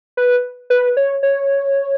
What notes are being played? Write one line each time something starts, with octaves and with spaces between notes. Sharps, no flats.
B4
B4
C#5
C#5